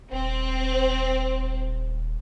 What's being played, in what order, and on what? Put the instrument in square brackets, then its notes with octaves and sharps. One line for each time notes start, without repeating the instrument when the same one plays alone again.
[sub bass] D#1 [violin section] C4